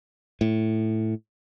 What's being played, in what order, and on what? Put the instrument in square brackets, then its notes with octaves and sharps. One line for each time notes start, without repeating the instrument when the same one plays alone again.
[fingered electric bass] A2